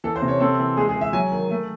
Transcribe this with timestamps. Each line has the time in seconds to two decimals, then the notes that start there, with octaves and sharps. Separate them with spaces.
0.04 E3 A4
0.16 C5
0.22 C3
0.28 C#5
0.40 C4 A4
0.59 E3
0.77 G#3 G#4
0.89 G#4
0.95 E3
1.01 E5
1.13 F#3 G#5
1.32 D#3
1.51 A3